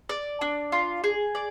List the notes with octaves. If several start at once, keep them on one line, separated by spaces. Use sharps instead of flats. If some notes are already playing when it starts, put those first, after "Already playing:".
D5
D4
F4
G#4
D5